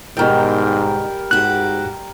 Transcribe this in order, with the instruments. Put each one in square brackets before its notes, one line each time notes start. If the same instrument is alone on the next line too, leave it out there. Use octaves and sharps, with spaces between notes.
[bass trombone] G#2 [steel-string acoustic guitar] B2 D#3 [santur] G3 A#4 G5
[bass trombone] G#2 [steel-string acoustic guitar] F#4 G4 [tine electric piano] F#6